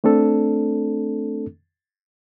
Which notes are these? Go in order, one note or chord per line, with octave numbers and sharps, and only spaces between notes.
A3 C4 D4 A4